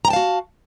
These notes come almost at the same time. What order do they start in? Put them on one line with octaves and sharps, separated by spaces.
A#5 G5 A5 F5 F#4